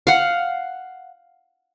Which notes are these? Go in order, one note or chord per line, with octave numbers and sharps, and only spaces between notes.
F5 F#5